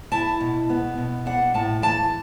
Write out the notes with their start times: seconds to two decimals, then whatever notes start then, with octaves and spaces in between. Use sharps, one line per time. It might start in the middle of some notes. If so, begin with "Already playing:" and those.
0.12 E4 A5
0.40 B2
0.70 B3
0.97 B2
1.26 D4 F#5
1.54 A2 A5
1.82 E3 A5